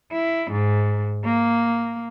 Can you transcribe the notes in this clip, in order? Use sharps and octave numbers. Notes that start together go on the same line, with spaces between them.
E4
G#2
A#3